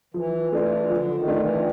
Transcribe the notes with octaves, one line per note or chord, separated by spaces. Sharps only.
E3 F3
E3 A3 D4 F4
D3 F3
D#3
A3 D4 F4
E3